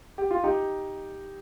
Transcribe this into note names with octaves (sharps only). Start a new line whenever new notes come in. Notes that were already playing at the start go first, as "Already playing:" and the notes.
G4
F4
D#4 G4